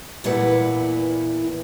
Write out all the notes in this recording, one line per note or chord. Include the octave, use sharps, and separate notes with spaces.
E2 A#2 E4 B4 F#5